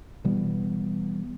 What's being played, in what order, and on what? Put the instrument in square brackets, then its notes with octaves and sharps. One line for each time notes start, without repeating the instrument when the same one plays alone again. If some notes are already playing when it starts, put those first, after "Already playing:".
[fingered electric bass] B2 E3 G3 B3